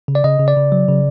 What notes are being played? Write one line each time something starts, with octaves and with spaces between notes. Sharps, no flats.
C#3
D5
C#3 D#5
C#3
D5
C#3
F#3
C#3